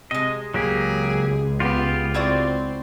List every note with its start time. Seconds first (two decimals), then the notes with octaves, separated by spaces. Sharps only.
0.11 C3 G#3 D#5
0.54 C#2 F#3 A#3 G4 G#4
1.60 B3 F4 G4
2.14 C4 E4 F#4 D5